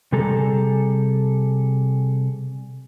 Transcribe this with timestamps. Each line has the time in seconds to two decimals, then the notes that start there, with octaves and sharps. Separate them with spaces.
0.12 C3 G3 G#4 A4 A#5